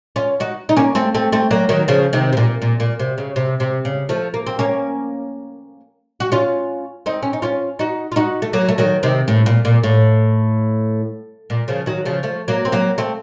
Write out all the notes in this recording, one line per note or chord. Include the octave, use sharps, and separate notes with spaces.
C#4 F4
D#4 F#4
D#4
A#3 C#4
A3 C4
A3 C4
A3 C4
F#3 A#3
D#3 F#3
C#3 F3
C3 D#3
C3
A#2
A#2
A#2
C3
C#3
C3
C3
C#3
F3 A3
A#3
C4
A#3 C#4
F#4
C#4 F4
C4 D#4
C#4
D#4
C#4 F4
D#4 F#4
F4
D#4 F#4
A3
F#3 A#3
A3
D#3 F#3
C3 D#3
A2
A#2
A#2
A2
A#2
C#3 F3
D#3 F#3
C#3 F3
F3 A3
F#3 A#3
C4
F#3 A#3
A3 C4